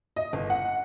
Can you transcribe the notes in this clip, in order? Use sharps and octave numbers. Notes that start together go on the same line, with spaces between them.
D#5
G1
F#5